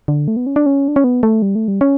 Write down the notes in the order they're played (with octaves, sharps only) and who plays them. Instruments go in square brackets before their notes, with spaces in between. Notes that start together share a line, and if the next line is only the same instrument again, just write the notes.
[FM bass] D3
A3
B3
C#4
D4
C#4
D4
C#4
B3
A3
G3
A3
G3
C#4